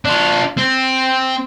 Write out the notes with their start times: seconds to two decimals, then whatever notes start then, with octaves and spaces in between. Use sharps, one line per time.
0.05 D4 F4
0.58 C4